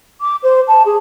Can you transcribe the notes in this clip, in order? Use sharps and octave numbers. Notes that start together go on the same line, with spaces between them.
D6
C5
A5
G#4